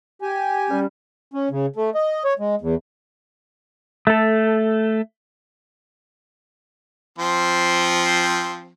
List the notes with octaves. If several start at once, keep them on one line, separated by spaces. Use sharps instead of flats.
G4 G#5
G3 C#4
C#4
C#3
A3
D#5
C#5
G#3
E2
A3 A4
F3 C4